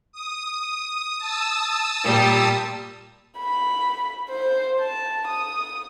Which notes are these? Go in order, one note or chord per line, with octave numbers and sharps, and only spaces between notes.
D#6
A5 D#6 E6
A#2 G3
B5
C5
A5
D#6